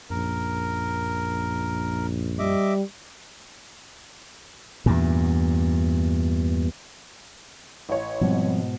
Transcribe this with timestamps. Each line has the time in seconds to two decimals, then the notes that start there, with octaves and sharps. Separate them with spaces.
0.10 A#1 F#2 A#4
2.39 G3 D#5 E5 D6
4.86 E2 G2 A#2
7.89 A1 C#5
8.21 G#2 B2 F3 G3 C4